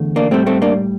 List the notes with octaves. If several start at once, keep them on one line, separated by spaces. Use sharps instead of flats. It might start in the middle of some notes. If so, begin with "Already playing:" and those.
Already playing: E2 D3 A3
A#3 D4
A2 G3 A3 C4
A3 C4
A#3 D4